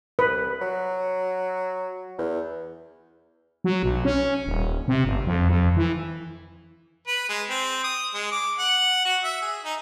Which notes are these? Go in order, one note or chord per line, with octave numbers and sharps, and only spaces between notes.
C2 B4
F#3
E2
F#3
B1
C#4
D#1
C3
G1
F2
F2
E3
B4
G#3
C4
D#6
G#3
D6
F#5
F#4
E5
G#4
D#4